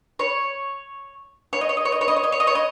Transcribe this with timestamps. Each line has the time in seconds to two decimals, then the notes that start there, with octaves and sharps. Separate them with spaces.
0.19 C#5
1.53 C#5
1.61 D#5
1.69 C#5
1.77 D#5
1.85 C#5
1.92 D#5
2.01 C#5
2.08 D#5
2.16 C#5
2.24 D#5
2.32 C#5
2.40 D#5
2.47 C#5
2.55 D#5